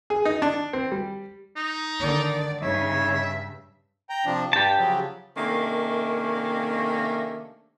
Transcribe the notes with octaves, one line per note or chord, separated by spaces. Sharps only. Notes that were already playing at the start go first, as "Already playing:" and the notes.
G#4
D#4
D4
C4
G3
D#4
D3 D#3 D5
G2 C#3 D#4 C#5 E5
G5 A#5
C3 F3 D4
G2 G3 G4 A5
C#3 F3 F#3
C3 D#3 A3 A#3 C#4 D4